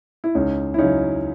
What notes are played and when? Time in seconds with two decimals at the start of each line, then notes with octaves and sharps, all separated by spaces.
0.24 E4
0.35 C#2 C#4 D#4
0.74 E4
0.78 C#3 F#3 C#4 D#4